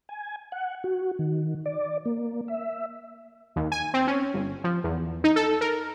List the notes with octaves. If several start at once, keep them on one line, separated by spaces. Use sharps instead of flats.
G#5
F#5
F#4
D#3
D5
A#3
E5
D#2
G#5
C4
C#4
G1
F3
E2
D#4
A4
A#4